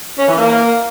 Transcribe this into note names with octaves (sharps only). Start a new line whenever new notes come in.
C#4
E3
A#3